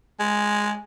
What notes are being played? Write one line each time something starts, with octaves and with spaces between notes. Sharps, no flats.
G#3